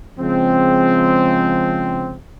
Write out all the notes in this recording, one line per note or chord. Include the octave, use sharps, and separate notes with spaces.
C#3 F3 G#3 C4